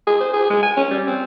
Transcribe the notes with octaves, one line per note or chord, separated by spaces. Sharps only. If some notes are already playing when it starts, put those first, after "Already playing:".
G#4
C5
G#4
G#3
G#5
C#4
G3
C4